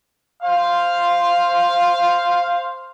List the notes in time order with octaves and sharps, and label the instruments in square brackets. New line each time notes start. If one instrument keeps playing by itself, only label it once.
[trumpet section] C5 F5